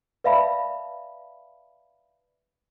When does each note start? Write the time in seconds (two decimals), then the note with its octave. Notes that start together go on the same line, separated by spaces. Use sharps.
0.24 B4 D5 E5 F5 A5 B5